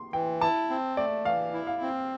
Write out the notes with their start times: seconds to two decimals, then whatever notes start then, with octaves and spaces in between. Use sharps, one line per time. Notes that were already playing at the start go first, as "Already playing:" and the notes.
Already playing: C6
0.13 E3 G5
0.41 E4 A5
0.70 C4
0.97 A3 D5
1.25 E3 F5
1.54 E4
1.67 F5
1.82 C4